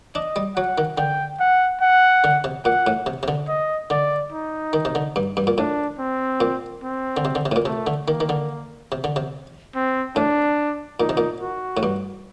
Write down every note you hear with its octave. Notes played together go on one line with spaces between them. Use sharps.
D4 D#5
G3
F#3 F#5
D#3
D3 G5
F#5
F#5
D3
C3
A#2 F#5
A2
C3
C3
D3
D#5
D3 D5
D#4
D#3
C3
D3
G2
G2
A#2
A2 D4
C4
A#2
C4
D3
C3
D3
C3
A2
A#2
C3 A3
D3
D#3 A#3
D#3
D3
C3
D3
C3
C4
A2 D4
A#2 D#4
C3
A#2
F#4
A2
G2